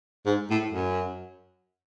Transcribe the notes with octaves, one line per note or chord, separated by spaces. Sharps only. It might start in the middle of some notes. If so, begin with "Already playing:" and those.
G#2
A2
F#2